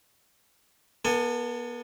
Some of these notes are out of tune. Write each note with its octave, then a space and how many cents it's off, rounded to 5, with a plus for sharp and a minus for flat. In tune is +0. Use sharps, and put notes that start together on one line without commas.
B3 -35 A4 +25 G#5 +0